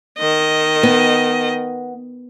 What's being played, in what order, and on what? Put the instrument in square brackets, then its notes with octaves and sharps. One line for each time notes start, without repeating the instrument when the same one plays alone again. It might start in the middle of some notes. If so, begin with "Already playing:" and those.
[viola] D#3 D#5
[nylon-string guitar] B3